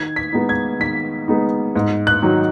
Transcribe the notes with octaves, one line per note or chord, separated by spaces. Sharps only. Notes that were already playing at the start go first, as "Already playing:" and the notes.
Already playing: D#3 G#6
B6
G#3 B3 D#4
G#6
D#3 B6
G#3 B3 D#4
G#2
F#6
D#3 F#3 D#4